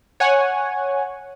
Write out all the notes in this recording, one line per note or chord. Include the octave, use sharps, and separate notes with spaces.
C#5 F#5 G#5